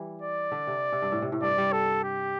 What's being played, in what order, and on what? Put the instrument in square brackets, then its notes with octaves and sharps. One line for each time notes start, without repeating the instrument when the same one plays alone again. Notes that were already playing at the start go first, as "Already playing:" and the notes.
Already playing: [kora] E3 G3
[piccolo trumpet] D5
[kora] D3
C3
C3
G2
A2
C3
A2
[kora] G2 [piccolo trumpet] D5
[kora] G3
[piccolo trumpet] A4
G4